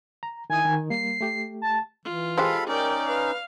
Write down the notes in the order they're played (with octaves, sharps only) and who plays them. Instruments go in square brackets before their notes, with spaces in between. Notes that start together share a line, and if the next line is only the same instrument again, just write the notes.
[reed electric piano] A#5
[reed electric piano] D#3 E4 D#6 [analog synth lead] G#5
[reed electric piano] D#3
[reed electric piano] G3 A#3 [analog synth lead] C7
[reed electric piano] A3 G4
[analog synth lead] A5
[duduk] E3 [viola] F4
[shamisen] G#3 G4 C5 [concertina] A4 F5 B5
[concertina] C#4 D#4 [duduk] A#4 [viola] D5 G5
[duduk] B4 [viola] F5